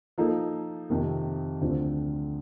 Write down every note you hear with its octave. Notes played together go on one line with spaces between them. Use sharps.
F3 A#3 D#4 A4
F2 C3 D#3
D2 D3 F3 C4